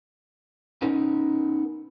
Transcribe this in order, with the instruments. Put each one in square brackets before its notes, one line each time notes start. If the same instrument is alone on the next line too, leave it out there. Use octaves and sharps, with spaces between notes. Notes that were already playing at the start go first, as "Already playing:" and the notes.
[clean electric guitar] B3 C#4 D#4 A#4